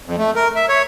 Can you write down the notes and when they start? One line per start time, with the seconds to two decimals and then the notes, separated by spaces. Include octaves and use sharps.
0.06 F2
0.18 A3
0.35 A#4
0.56 E5
0.69 C#5